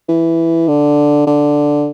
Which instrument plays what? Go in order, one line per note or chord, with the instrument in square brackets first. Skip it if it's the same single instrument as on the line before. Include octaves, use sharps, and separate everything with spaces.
[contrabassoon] E3
D3
D3